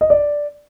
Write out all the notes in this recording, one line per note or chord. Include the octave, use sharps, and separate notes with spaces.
D#5
D5